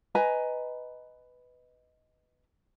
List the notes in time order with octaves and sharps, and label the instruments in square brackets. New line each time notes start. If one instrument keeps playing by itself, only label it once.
[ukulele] B4 D#5 G#5 A#5